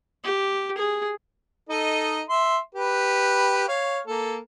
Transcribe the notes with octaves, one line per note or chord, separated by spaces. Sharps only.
G4
G#4
D#4 A4 D#5
E5 C6
G4 B4
C#5 F5
A#3 A4